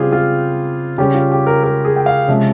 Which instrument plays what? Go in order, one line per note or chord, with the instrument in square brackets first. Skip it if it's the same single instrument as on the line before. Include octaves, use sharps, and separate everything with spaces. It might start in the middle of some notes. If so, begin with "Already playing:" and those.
Already playing: [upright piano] C#3 G3 C4 F4 G4 G#4
F4
C#3 G3 C#4 G4
F4
G4
A#4
A#4
G#4
G5
F5
C3 F3 G#3 C#4 E5